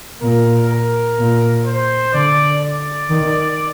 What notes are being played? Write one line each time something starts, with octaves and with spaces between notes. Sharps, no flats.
A#2 A#4
A#4
A#2
C5
D3 D5
D5
D#3